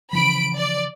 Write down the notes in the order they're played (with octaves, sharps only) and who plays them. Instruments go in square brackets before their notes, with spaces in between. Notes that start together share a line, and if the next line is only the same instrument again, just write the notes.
[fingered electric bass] C#3 E3 F3 [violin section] B5 D7
[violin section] D5